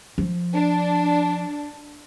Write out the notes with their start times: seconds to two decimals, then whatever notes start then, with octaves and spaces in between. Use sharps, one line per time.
0.18 F3
0.53 D4